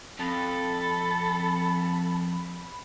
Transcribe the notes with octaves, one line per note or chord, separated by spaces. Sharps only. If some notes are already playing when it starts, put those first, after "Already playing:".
F2 A4 B5